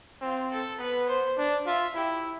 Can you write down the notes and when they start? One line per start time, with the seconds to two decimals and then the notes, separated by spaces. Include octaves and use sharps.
0.21 C4 F4
0.51 A4
0.79 B3 B4
1.09 C5
1.38 D4
1.66 F4 E5
1.95 E4 G4